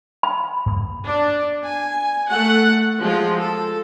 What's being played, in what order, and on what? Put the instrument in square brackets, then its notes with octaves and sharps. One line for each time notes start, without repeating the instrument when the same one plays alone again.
[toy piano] B5
[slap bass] G2 A#3
[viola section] D4
G#5
A3 F#5
F3 G#3 F4
A4